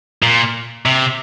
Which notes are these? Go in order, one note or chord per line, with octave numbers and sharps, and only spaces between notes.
A#2
C3